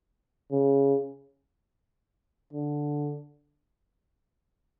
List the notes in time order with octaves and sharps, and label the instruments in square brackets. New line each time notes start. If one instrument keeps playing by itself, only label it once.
[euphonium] C#3
D3